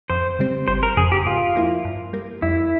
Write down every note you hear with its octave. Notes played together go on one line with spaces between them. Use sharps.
F2 C5
C#3 G3 C4
G1 C5
A#4
F2 C#3 G#4
G4
G#2 F4
F3 A#3 E4
G2
G3 A#3
F2 E4